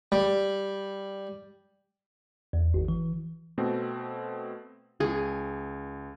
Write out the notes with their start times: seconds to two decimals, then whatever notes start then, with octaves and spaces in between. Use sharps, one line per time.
0.12 G3
2.53 E2
2.74 G#1
2.88 E3
3.58 B2 A3 C4
5.00 C#2 G#4